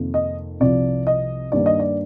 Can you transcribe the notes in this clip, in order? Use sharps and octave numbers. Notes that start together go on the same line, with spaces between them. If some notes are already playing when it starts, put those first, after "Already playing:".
Already playing: F2 C3 D#3 A#3
D#5
C2 C3 F3 D5
D#5
G2 D#3 G3 A#3 D4 D5
D#5
D5